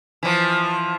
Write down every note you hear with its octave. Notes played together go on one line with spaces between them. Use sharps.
E3 F3